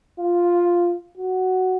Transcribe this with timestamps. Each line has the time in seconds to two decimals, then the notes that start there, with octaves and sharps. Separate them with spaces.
0.19 F4
1.17 F#4